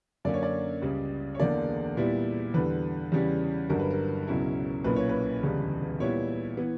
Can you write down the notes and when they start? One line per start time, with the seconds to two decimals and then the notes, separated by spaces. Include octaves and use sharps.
0.25 F#2 D3 A#3 C#4 D5
0.34 C#5
0.43 D5
0.82 C#2 C#3 G3
1.35 C#5
1.39 E1 E2 D3 A#3 D5
1.97 A#2 G3 B3 E4
2.54 E2 D3 G3 B4
3.12 E2 C#3 G3 C#4
3.69 G1 G2 D3 F#3 A#4
3.80 B4
3.90 A#4
4.27 C#2 B2 F#3 C#4 E4
4.84 B1 A#2 A#3 C#4 E4 B4
4.96 C#5
5.09 B4
5.43 E1 D2 C#3 G3
6.00 A#2 G3 B3 E4 C#5
6.57 E3 B3